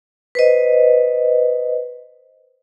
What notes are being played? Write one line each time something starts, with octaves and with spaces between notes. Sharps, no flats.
B4 C5 D#5